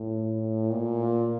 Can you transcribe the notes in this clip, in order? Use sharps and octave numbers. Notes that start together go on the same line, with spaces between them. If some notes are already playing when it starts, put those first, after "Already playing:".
Already playing: A2
A#2